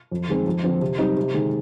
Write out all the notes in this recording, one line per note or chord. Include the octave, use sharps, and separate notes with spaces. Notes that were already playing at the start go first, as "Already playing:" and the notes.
F2
D#3 G#3 C4
F2
D3 F3 C4
C3
G3 C4 D#4
C3
D#3 G#3